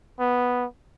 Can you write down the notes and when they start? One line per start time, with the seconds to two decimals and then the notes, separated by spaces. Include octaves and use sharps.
0.19 B3